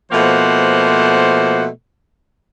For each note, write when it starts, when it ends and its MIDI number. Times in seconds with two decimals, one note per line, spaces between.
0.12 1.67 47
0.12 1.67 53
0.12 1.67 57
0.12 1.67 58
0.12 1.67 72
0.12 1.67 78